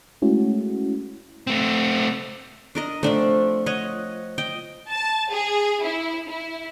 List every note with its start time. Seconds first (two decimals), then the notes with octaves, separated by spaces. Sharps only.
0.22 G#3 A3 C#4 E4 F#4
1.47 A3 C4
2.75 D4 A#4 D#5
3.03 F3 A3 C4 D4
3.66 C#5 D#5 F#5
4.38 D#5 G5
4.89 A5
5.31 G#4
5.83 E4
6.28 E4